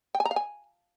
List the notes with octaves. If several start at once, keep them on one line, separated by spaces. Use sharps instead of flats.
G5
G#5
A#5
F5
G#5